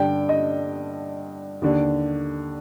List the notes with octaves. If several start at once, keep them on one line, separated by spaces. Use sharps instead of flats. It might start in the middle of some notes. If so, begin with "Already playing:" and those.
Already playing: G2 D3 G5
D#5
D#2 D3